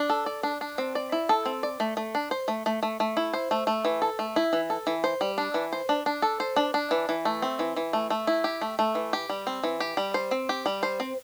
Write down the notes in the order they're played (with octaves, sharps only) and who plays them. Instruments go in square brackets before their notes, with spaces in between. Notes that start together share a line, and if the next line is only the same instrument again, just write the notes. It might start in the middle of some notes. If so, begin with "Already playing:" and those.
Already playing: [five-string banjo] D4
A4
D5
D4
D4
C4
D5
E4
A4
C4
D5
A3
A3
D4
C5
A3
A3
A3
A3
E4
C5
A3
A3
E3
A4
A3
E4
E3
A4
E3
C5
G3
D4
E3
C5
D4
D4
A4
C5
D4
D4
E3
E3
A3
C4
E3
E3
A3
A3
E4
G4
A3
A3
E3
G4
G3
C4
E3
G4
G3
C5
C4
G4
G3
C5
C4